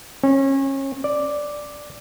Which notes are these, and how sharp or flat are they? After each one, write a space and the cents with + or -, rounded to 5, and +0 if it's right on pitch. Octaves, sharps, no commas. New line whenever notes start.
C#4 -30
D5 +0